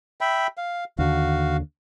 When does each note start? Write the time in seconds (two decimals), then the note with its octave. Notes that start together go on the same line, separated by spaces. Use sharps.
0.21 E5 G5 B5
0.57 F5
0.98 D#2 D3 F#4 F5